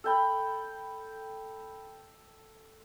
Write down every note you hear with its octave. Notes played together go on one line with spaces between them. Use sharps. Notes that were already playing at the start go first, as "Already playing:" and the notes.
A4 G5 B5